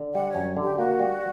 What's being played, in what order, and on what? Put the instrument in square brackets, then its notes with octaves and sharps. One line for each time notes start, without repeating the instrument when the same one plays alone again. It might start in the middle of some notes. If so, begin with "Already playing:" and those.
Already playing: [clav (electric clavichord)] D3
[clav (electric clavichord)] G3 [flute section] F#5
[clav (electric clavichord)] F#2 [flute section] C#5
[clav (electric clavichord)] D3
[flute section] G4
[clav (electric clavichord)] A#3 [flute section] F#4
[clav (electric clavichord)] G3